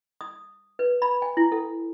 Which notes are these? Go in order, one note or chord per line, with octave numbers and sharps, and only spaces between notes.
D#6
B4
B5
G#5
E4
A4